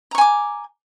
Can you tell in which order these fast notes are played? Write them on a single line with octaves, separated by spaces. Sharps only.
A#5 C#6 G#5 D6